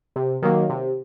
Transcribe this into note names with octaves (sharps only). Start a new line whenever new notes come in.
C3
D#3 F#3 A#3
C3